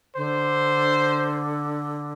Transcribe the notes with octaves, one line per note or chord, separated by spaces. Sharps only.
D3 C5